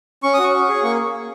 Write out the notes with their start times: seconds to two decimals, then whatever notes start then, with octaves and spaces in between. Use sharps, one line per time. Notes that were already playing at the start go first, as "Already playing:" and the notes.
0.23 C#4 C#6
0.34 F#4 D#6
0.44 C#6
0.54 C#4
0.68 G#4
0.83 A#3 C#6